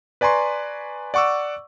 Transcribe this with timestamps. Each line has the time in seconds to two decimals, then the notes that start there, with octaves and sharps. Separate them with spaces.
0.21 B4 D5 G#5 A#5 C6 C#6
1.14 D5 F#5 C#6 D6 E6